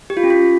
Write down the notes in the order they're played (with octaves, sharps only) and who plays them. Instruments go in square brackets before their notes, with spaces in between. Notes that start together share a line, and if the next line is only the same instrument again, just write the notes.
[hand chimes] G4
F4
C#4
F4